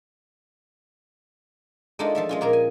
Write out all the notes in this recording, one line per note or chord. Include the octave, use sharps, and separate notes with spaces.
G#3 A3 D4 D#4 F4
F3 A4 E5
G#3 C#4 F4
A#2 A#3 G#4 A#4
G#5